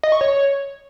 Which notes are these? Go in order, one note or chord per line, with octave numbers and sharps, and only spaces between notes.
D#5
C#6
C#5